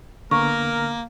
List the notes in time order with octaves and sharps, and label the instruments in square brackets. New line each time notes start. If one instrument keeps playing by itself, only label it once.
[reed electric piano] D3 B3 [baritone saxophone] A#3 [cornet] A#4 [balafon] C#6